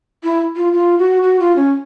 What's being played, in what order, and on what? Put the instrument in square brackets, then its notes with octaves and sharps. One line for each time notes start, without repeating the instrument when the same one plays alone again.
[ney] E4
F4
F4
F#4
F#4
F4
C#4